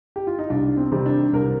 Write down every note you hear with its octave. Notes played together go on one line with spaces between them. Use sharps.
G4
F4
D#4
C2 D4
C4
C3 D#3 G3
D4
C2 A#4